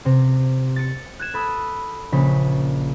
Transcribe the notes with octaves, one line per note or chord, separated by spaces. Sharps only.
C3
A6 C#7
F#6 G#6 E7
A4 B5 D#6 E6
A#1 C#3 B6